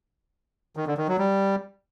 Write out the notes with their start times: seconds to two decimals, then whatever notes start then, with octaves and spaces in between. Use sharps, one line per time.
0.76 D#3
0.87 D3
0.98 D#3
1.08 F#3
1.19 G3